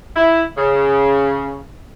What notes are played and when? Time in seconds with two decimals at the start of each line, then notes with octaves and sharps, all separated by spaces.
0.16 E4
0.57 C#3